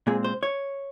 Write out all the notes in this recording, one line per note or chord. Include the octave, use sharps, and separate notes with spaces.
A#2 G#3 C4 G#4
C5
C#5